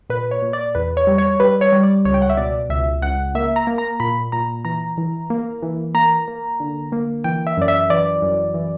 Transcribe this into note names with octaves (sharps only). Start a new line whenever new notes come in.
A#2 B4
C#5
A#2
D5
E2 B4
C#5
G3
C#5
G3 B4
C#5
G3
D5
C#2 C#5
G5
F#5
E5
B2 D5
C#2 E5
C#2 F#5
A#3 E5
A#5
A#3
A#5
A#2 B5
A#2 A#5
E3 A#5
E3
A#3
E3
A#3 A#5
A#3
D3
A#3
E3 G5
E5
F#2 D5
E5
E3 D5
F#2
E3